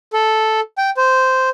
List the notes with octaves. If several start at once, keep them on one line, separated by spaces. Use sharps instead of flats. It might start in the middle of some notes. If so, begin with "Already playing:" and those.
A4
G5
C5